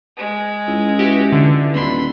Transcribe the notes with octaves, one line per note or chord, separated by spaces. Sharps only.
G#3
C#2 E4
E4 F#4 G4 B4 E5
D3
D#1 B5 C6